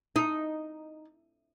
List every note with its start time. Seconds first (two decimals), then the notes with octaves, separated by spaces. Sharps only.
0.16 D#4